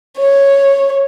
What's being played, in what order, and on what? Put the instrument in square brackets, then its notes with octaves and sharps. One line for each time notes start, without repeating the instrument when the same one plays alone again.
[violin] C#5